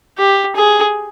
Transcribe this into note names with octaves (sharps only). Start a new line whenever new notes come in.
G4
G#4